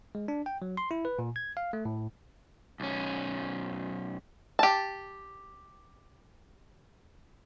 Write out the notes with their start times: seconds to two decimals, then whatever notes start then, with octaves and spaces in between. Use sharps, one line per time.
0.15 G#3
0.28 D4
0.46 G5
0.62 F#3
0.77 C6
0.91 E4
1.05 B4
1.19 A#2
1.36 G#6
1.57 F5
1.73 A3
1.85 A2
2.80 B1 C#4
4.59 G4 A5